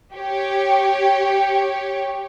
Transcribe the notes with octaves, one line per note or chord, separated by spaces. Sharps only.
G4 C#5